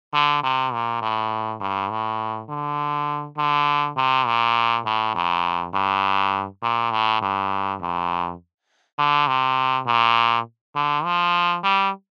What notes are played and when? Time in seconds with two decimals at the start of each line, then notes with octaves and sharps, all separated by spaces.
0.13 D3
0.43 C3
0.73 A#2
1.02 A2
1.60 G2
1.90 A2
2.49 D3
3.37 D3
3.96 C3
4.26 A#2
4.85 A2
5.15 F2
5.73 G2
6.62 A#2
6.91 A2
7.21 G2
7.80 F2
8.98 D3
9.27 C3
9.86 A#2
10.75 D3
11.04 F3
11.63 G3